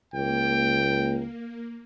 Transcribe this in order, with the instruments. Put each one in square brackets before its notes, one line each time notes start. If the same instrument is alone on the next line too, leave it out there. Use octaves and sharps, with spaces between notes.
[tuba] C#2 [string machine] A#3 [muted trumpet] G5